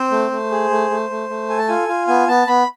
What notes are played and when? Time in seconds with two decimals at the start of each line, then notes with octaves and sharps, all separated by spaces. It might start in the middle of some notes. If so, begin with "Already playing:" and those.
Already playing: C4 C5
0.11 A3
0.31 A3
0.51 G#4
0.70 A3
0.90 A3
1.10 A3
1.29 A3
1.49 A4 G#5
1.58 A5
1.68 F4 G#5
1.88 F4
2.08 B3 G#5
2.28 B3 A5
2.47 B3 B5